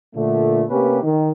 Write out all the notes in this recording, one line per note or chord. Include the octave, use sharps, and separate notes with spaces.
A#2 D3 A3
C3 A#3 B3 C#4 G4 B4
D#3